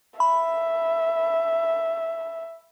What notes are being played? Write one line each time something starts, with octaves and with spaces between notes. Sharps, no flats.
E5 B5